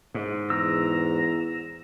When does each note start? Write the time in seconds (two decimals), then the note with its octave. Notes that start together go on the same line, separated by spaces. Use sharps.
0.14 G#2
0.50 E2 A#5 E6